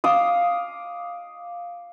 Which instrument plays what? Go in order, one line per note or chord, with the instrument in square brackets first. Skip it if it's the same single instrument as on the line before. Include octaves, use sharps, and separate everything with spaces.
[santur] F5 D6 D#6